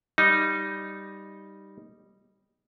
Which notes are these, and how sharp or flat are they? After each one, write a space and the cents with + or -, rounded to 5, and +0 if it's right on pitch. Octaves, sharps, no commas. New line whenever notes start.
G3 +0 D#4 +0